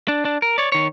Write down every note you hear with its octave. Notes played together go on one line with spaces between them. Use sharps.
D4
D4
A#4
C#5 D5
D#3 C#5